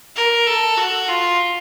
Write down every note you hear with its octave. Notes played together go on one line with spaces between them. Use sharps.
A#4
A4
F#4
F4